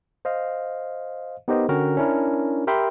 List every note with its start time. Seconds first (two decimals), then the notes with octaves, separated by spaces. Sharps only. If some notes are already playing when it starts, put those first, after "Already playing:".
0.25 C5 D#5 F5
1.48 B3 D#4 G4 A#4 C5 D#5
1.69 D3 C#4 F#4 A#4 G5 A#5
1.97 C#4 D4 E4 A#4
2.67 G4 A#4 E5 G5 B5 C6